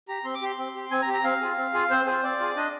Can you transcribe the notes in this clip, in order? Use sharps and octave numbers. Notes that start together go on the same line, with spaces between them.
G4 A#5
C4 C6
D6
G4 C6
C4
G4
C4 G#5
A#5
G4
A#5
C4 F5
F4 G#4
C4
F4 G#4
C4 C5
F4 G#4 C5
C4 D5
F4 G#4
D4 D#5